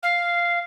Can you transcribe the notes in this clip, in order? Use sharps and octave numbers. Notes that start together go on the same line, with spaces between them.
F5